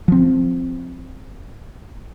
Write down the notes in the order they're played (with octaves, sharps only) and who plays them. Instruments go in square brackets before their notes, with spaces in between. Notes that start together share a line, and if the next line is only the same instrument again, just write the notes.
[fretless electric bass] F3 C4